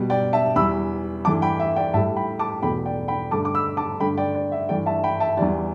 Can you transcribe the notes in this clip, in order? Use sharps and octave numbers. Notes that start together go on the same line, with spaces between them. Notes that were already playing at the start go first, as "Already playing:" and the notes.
Already playing: B2 G3
D5 G5
E5 A5
E2 E3 G3 B5 E6
G2 E3 A3 A5 D6
G5 B5
E5
D5 G5
A2 G3 E5 A5
G5 B5
A5 D6
E2 B2 A3 G5 B5
D5 G5
G5 B5
G2 D3 A3 A5 D6
D6
B5 E6
A5 D6
G2 D3 A3 G5 B5
D5 G5
D5
E5
G2 E3 A3 D5 G5
E5 A5
G5 B5
E5 A5
E2 E3 G3 D5